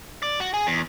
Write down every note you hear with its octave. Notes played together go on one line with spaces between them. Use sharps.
D5
F#4
G#4
E2